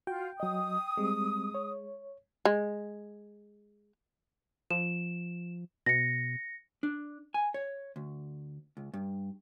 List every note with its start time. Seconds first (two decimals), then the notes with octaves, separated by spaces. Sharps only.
0.07 F4 F#4 G5
0.40 F#3 D#5 D#6
0.97 G3 G#3 C4
1.55 C#5
2.45 G#3
4.71 F3 E7
5.86 B2 A#6 C#7
6.83 D4
7.34 G#5
7.54 C#5
7.96 D2
8.77 C#2
8.94 G2